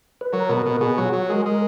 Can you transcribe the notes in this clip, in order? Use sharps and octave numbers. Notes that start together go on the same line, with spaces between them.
B4
F#3 A#4
B2
A#4
B2
A#4
B2 G#4
F#3
F#4
F#3
G#3 A#4
G#3 A#4